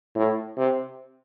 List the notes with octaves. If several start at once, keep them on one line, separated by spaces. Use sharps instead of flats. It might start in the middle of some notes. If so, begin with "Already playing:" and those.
A2
C3